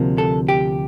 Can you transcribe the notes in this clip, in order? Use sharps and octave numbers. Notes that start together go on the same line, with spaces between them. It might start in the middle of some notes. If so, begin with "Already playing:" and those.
Already playing: D2 C3 F3 A#3
A4
G4